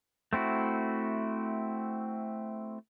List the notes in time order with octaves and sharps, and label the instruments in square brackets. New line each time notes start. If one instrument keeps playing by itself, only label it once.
[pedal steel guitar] A3 C4 E4 F#4